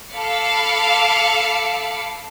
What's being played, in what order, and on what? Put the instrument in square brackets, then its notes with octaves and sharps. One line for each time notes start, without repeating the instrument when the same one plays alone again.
[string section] A4 F5 B5 D6 C7 C#7